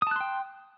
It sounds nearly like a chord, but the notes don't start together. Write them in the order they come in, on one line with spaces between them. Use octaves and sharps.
D#6 A5 F#6 C6 G5